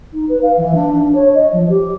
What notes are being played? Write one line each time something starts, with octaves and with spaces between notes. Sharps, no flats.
D#4
B4
F5
E3
D4
D4
D4
C#5
D#5
F3
G4